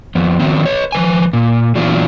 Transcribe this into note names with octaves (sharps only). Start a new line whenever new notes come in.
F2 B3
D#3 F3 F#3 B3 C4
B4 C#5
F3 B4 G#5
A#2
A#2 E3 F#3 B3 D4 F4